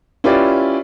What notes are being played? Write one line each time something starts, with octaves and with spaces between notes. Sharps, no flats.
C#4 E4 F4 G4 B4 D5